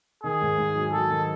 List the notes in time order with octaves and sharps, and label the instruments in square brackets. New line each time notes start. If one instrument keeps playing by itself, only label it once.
[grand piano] D#3 [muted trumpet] G#4
[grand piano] G#2
G#2
F#3
[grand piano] F#3 [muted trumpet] A4
[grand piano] D#3